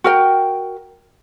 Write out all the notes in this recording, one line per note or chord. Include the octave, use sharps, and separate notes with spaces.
F#4 A#4 G5